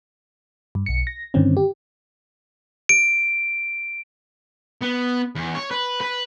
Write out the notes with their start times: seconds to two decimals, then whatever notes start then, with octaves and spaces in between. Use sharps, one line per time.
0.75 G2
0.86 B1 C#7
1.07 A#6
1.34 G2 D3 D#3 C4 C#4
1.57 G4
2.89 D7
4.81 B3
5.36 E2
5.55 C#5
5.71 B4
6.01 B4